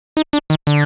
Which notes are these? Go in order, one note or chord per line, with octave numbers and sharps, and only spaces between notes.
D#4
D4
D#3
D3